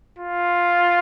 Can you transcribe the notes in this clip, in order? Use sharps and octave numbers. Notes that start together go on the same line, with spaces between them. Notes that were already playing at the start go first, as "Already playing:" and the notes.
F4